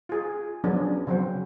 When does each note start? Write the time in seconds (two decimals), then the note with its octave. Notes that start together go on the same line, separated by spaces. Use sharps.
0.09 F4 G#4
0.64 F3 F#3 B3 C#4 D4 G#4
1.07 C#3 F3 F#3 C4 C#4 C5